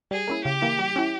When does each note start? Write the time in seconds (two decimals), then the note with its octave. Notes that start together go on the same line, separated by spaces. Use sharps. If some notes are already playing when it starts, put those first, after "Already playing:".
0.11 G3 G#4
0.27 A#3 C#4 E4
0.45 C#3 G4
0.62 E3 A#3 E4
0.79 G3
0.96 C#4 E4